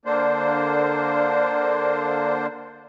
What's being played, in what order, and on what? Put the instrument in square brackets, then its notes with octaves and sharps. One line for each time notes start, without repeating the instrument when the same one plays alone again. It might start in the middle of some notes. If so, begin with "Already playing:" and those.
[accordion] D3 A#3 D4 C5